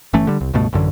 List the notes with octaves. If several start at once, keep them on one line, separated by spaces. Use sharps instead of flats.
G1 E3 A3 C#4
D3 G3
C2
C#2 G2 B2 A3
A1 F#2 D3